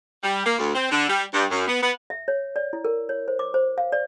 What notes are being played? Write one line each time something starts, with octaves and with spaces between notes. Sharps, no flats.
G3
A#3
D2
C4
D3
G3
G2
F#2
B3
B3
E5
C#5
D5
E4
A#4
C#5
C5
D6
C5
F5
D5